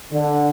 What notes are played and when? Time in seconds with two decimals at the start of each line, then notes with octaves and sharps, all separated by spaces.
0.11 D3